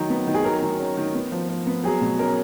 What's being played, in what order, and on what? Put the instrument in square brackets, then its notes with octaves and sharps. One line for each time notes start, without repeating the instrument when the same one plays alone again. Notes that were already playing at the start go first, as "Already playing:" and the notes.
Already playing: [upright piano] D#3 F#3
B3
D#3
G#4
F#3 A#4
D#3
C#4
D#3
B3
F3
F3
B3
F#3 G#4
B2
C#4 A#4